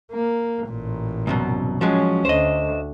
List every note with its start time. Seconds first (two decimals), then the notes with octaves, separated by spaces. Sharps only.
0.12 A#3
0.68 A1 A#2
1.27 C2 F#2 B2
1.81 F3 F#3 G#3 C#4
2.25 D2 C5 D#5